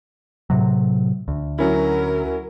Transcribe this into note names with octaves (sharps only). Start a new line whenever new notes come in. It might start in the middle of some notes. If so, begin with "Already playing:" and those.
A2 C3 F#3
D2
F#3 C#4 E4 A#4